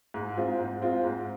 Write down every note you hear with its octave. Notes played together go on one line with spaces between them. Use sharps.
G#2
G#3 C4 F4
G#2
G#3 C4 F4
G#2